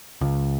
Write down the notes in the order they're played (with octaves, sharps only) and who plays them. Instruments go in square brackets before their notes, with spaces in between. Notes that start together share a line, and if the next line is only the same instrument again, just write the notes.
[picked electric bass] C#2